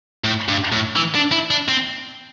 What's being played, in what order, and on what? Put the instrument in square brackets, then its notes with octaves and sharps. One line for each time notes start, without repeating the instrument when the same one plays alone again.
[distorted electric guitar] A2
G2
A2
E3
D4
E4
D4
C4